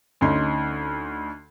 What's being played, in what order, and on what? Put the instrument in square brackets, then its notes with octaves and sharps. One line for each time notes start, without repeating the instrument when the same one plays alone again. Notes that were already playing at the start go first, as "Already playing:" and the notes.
[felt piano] D2 C#4 D#4 C6